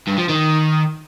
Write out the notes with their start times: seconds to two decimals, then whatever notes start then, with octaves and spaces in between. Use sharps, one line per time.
0.07 G2
0.18 F3
0.29 D#3